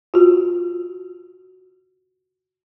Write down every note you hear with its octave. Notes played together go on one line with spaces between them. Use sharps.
F4 F#4